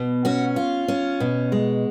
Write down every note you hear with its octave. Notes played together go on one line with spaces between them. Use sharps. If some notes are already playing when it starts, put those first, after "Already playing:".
Already playing: B2
C#4 F#4
F4
C#4
B2
G#3